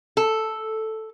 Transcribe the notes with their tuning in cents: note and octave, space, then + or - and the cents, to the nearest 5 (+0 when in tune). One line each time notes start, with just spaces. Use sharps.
A4 +0